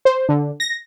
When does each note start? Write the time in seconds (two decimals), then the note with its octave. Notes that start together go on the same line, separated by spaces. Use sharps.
0.05 C5
0.29 D3
0.60 A#6